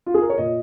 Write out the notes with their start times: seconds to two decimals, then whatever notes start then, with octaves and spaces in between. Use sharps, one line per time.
0.06 F4
0.14 G#4
0.22 A#4
0.30 C#5
0.38 A#2 D#5